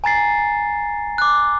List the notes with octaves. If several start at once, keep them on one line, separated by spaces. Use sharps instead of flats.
G#5 A#5 A6 C7
D6 F#6